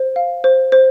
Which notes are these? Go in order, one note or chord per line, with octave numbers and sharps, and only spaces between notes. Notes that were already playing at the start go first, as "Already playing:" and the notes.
Already playing: C5
F5
C5
C5